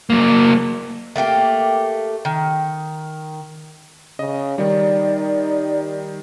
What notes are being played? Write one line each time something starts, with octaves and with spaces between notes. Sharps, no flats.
F#3 A#3
A3 A#3 F#4 G4
D#3
C#3 D#5
D#3 G3 D#4 D5